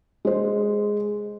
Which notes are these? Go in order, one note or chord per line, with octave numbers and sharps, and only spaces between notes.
G#3 C5